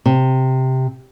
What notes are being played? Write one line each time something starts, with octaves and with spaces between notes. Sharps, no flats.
C3